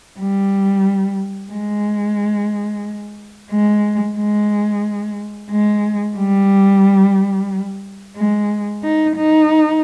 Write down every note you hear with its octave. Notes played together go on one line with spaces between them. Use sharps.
G3
G#3
G#3
G#3
G#3
G3
G#3
D#4
D#4